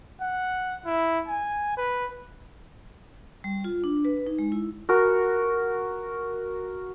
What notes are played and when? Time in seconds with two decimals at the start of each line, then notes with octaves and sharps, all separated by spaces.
0.21 F#5
0.86 E4
1.28 G#5
1.77 B4
3.44 G3
3.64 F4
3.84 D4
4.05 B4
4.26 D#4
4.39 G#3
4.52 E4
4.89 F#4 A#4